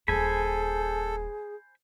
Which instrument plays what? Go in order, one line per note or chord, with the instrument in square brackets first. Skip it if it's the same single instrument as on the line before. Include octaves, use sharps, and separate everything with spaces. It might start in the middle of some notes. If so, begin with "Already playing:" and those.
[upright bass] D#1 D4 [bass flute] G#4 [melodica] A4 [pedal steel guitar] C5 G#5 B5